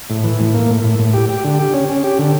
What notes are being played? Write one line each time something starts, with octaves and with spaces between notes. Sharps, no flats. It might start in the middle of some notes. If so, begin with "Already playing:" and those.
A2
E3
A2
A#3
A2
A2
A2
G4
G4
D3
G4
C#4
C#4
G4
D3